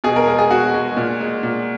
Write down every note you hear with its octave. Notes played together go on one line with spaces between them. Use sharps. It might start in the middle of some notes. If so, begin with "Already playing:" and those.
B2 G#4
A#4
G#3 G#4
G#4
B2 F#4
G#3
A#2
G#3
A#2